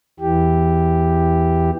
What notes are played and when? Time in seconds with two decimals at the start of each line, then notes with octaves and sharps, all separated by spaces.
0.20 E2 E3 G4